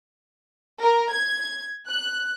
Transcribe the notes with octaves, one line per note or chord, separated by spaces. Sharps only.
A#4
G#6
F#6